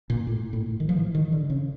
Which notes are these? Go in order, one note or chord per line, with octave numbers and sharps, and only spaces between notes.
A#2
A2
A2
D#3
F3
E3
D#3
D3
C#3